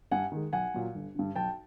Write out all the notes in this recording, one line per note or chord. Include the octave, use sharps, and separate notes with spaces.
G2 F#5 G#5
D#3 G#3
B1 F#5 G#5
A#2 F#3
G1
G2 D3
B1 G5 A5